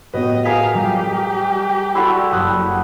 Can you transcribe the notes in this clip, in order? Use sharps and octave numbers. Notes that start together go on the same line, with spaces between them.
A2 B3 F#4 G4 B4 D#5
G#4 A#4 B4 D#5 F5 A#5 B6
G3 F4 G4
E4 F#4 A4 D5 B5 C6
F#1 F#5 D#6 F#6